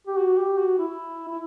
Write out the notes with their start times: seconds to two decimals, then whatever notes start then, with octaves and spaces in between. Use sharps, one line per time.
0.07 G4
0.19 F#4
0.38 G4
0.59 F#4
0.79 E4
1.29 E4